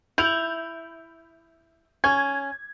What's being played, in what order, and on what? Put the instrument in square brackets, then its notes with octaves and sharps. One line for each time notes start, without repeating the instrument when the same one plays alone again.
[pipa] E4 [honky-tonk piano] G6 F7
[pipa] C#4 [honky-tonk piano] G#6